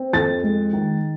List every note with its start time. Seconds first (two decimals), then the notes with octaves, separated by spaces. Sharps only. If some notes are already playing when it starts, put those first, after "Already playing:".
Already playing: C4
0.13 F2 A6
0.43 G#3
0.73 D#3